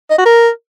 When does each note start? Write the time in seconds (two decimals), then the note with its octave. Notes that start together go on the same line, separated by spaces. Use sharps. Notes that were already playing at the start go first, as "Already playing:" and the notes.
0.10 D#5
0.18 F#4
0.25 A#4